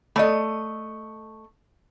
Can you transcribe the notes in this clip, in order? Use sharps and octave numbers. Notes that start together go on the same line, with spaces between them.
A3 A4 D5 D#5 B5